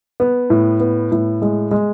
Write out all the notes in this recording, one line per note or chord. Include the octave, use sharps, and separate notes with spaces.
B3
A2
B3
A2
G#3
G#3